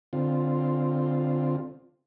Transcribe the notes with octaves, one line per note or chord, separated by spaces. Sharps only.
D3 C4 F4